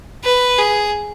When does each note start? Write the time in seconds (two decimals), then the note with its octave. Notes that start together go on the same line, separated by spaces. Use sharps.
0.24 B4
0.58 G#4